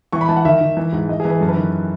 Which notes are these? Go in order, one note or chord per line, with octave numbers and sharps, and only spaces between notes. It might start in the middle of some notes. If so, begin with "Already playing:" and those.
E3 C#6
B5
E3 A5
F#5
D#3 E5
D#3
E3
G#2
E3 D#5
G#4
E3
B4
F#2 A4
B4
D#3